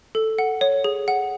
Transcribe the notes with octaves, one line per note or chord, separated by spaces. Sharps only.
A4
F#5
C#5
G#4
F#5